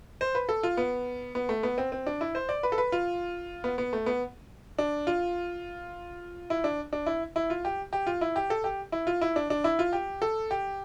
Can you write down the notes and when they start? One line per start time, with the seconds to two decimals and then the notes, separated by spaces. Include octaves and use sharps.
0.21 C5
0.35 B4
0.49 A4
0.63 F4
0.77 B3
1.35 B3
1.49 A3
1.63 B3
1.78 C4
1.92 C4
2.06 D4
2.21 E4
2.35 C5
2.49 D5
2.63 B4
2.72 A4
2.78 B4
2.92 F4
3.64 B3
3.78 B3
3.93 A3
4.06 B3
4.78 D4
5.07 F4
6.50 E4
6.64 D4
6.93 D4
7.06 E4
7.36 E4
7.50 F4
7.65 G4
7.93 G4
8.07 F4
8.21 E4
8.36 G4
8.50 A4
8.64 G4
8.92 E4
9.07 F4
9.21 E4
9.36 D4
9.50 D4
9.64 E4
9.79 F4
9.93 G4
10.22 A4
10.51 G4